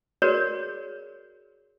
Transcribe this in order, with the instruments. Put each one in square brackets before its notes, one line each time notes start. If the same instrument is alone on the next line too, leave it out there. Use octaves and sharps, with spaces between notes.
[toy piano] F#4 G#4 A#4 B4 C#5 D5